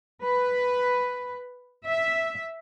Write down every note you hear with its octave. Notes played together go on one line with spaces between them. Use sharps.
B4
E5